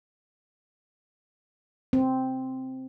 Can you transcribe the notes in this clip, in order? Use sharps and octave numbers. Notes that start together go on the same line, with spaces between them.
C4